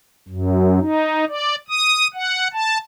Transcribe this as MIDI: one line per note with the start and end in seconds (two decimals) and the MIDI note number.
0.28 0.79 42
0.80 1.24 63
1.29 1.55 74
1.69 2.07 87
2.14 2.48 78
2.53 2.78 81